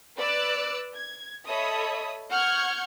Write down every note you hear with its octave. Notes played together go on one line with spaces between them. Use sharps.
B4 D5 D6 E6 F#6
G#6
A4 C#5 D#5 E5 B5 D#6
F#5 C#6 F6 G6 G#6